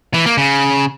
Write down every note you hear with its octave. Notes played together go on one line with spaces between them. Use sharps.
E3
A#3
C#3